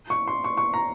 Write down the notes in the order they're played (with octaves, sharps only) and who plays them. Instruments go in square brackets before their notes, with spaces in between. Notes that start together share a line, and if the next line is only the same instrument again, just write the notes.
[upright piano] C#6
C6
C#6
C#6
A#5